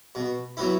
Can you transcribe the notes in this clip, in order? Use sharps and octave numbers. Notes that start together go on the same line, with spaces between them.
B2
F#3 B3 E4